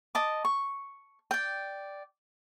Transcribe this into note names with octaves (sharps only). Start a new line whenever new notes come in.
D#5 A5 D6
C#6
D5 G5